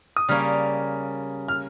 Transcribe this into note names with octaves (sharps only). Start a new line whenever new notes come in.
D#6
C#3 G3 A#3 C#4 F6
F6